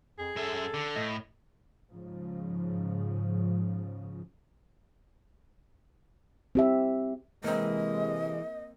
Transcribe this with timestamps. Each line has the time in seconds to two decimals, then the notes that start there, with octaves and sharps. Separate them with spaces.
0.18 F2 G#4
0.36 F#2 A4 E5
0.74 D3
0.96 A2 D#5
1.91 G#2 C#3 F3
6.55 C4 G4 E5
7.44 C3 E3 G#3 A#3 C4 D#5